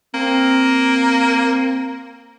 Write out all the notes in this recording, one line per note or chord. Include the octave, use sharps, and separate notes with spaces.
A#3 C4